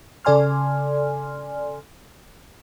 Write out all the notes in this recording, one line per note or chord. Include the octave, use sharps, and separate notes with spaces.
C#3 A4 D5 G#5 C6 F6